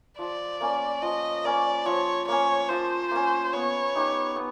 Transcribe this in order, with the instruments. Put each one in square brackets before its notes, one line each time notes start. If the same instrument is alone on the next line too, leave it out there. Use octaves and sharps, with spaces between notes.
[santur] F3 [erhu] D5
[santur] A#3 C#4
[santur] F3 [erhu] D#5
[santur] A#3 C#4 [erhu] D5
[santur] F3 [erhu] C#5
[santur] A#3 C#4 [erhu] C#5
[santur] F3 [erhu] C5
[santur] A#3 C#4
[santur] B3 [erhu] C#5
[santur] D#4 G4 B4
B3